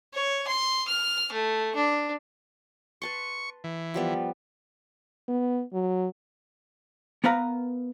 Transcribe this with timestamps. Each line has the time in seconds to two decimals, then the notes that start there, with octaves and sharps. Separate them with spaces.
0.14 C#5
0.48 C6
0.88 F6
1.32 A3
1.75 D4
3.02 B4 A5 C6 C#6
3.64 E3
3.94 F3 G3 B3
5.28 B3
5.73 F#3
7.24 B3 A#4 B4 F5 A#5